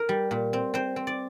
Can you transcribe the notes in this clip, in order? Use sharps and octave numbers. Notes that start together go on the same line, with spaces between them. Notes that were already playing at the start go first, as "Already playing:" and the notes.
Already playing: A#4
G3
A#2
C4
C4 C5
C4
D5